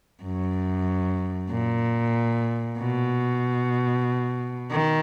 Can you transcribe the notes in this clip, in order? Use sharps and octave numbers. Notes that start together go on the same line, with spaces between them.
F#2
A#2
B2
D#3